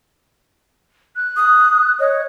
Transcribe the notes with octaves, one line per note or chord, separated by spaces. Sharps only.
F#6
D#6
C#5 D#5